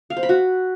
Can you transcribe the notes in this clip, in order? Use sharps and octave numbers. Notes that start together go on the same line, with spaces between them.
F5
C5
B5
F#4